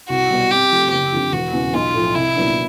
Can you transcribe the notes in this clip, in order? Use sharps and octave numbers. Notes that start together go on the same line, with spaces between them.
C2 F#4
B2 G3
C3 G4
F3 A3
F#1 G4
F2 D3 F3
E1 F#4
E2 C#3
B1 F4
A2 F3
C2 E4
A#2 F#3 B3 D4